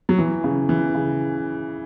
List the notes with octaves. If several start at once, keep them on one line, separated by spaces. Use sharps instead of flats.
F#3
E3
C#3
E3
C#3